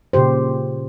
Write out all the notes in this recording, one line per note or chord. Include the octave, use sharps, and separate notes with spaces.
A#2 C#3 G4 C5